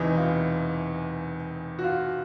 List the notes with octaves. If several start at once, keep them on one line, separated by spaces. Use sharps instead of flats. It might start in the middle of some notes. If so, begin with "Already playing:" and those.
Already playing: E1 E2 C3 E3 D#4
F4
F#4
F4